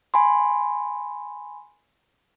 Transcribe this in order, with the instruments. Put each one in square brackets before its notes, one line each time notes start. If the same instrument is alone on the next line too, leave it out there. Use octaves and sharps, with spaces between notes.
[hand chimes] G#5 B5 C6